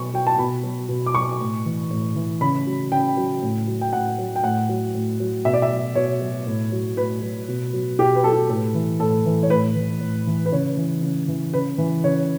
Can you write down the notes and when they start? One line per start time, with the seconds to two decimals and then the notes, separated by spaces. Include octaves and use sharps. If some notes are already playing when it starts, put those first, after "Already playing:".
Already playing: B2 F#3 C#6
0.13 F#3 G5
0.27 A5
0.38 B2 B5
0.63 F#3
0.88 B2
1.06 D6
1.15 F#3 C#6
1.40 A2
1.66 E3
1.91 A2
2.16 E3
2.41 C#3 B5
2.67 F#3
2.92 C#3 G5
3.17 F#3
3.42 A2
3.67 F#3
3.81 G5
3.93 A2 F#5
4.18 F#3
4.36 G5
4.44 A2 F#5
4.69 F#3
4.95 A2
5.20 F#3
5.45 B2 E5
5.53 D5
5.62 E5
5.71 F#3
5.95 B2 C#5
6.21 F#3
6.47 A2
6.72 F#3
6.97 A2 B4
7.22 F#3
7.48 B2
7.73 F#3
7.99 B2 G4
8.16 B4
8.24 F#3 A4
8.33 G4
8.49 A2 A4
8.75 E3
9.00 A2 A4
9.26 E3
9.43 C#5
9.50 A2 B4
9.76 E3
10.01 A2
10.27 E3
10.46 B4
10.52 C#3 C#5
10.77 E3
11.02 C#3
11.28 E3
11.54 C#3 B4
11.78 E3
12.04 C#3 C#5